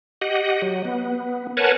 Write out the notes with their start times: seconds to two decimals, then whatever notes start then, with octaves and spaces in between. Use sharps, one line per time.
0.21 G4 D#5 F#5
0.62 F#3
0.85 B3
1.57 A#4 B4 C#5 F#5 G#5 A5